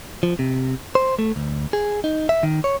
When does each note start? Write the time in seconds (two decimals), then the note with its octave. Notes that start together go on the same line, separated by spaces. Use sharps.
0.23 F3
0.39 C3
0.95 C5
1.19 A3
1.36 D2
1.73 G#4
2.04 D#4
2.29 E5
2.43 D#3
2.64 C#5